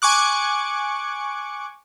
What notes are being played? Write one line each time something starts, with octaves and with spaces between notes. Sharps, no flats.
G#5 C#6 D6 F#6